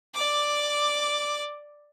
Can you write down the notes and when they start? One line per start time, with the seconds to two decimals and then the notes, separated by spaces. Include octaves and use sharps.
0.14 D5 D6